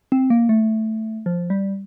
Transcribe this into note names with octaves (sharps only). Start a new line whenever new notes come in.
C4
A#3
A3
F3
G3